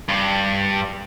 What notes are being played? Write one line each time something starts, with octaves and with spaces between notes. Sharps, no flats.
G2